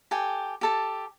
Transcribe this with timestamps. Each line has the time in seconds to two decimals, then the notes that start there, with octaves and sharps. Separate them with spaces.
0.11 G4 A4 G5 G#5
0.61 G4 A4 A5